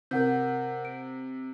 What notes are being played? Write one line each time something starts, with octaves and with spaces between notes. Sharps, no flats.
C3 A#4 F#5 G6
D7